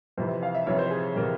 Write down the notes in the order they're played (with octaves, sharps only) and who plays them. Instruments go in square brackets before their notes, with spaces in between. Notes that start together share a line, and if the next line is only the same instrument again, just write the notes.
[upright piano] F2 C3 E3 C5
F5
E5
F2 C3 E3 C#5
C5
G#4
C3 E3 A#4